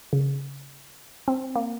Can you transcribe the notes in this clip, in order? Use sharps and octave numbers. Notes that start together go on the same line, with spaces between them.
C#3
C4
A#3